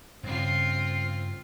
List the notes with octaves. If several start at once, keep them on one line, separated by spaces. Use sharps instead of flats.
G2 C#3 C4 F4